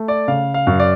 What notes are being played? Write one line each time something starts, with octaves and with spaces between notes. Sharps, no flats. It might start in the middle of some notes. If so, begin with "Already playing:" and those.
Already playing: A3
D5
C#3 F5
F5
F#2
D5